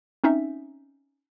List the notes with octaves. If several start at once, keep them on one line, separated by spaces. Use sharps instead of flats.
C4 C#4 D#4 E5